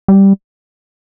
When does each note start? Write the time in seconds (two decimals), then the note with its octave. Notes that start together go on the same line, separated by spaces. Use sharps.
0.08 G3